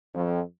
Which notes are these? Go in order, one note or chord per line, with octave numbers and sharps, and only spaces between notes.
F2